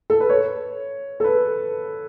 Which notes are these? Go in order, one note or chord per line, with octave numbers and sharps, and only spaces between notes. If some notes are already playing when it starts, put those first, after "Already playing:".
A4
B4
C#5
A4
B4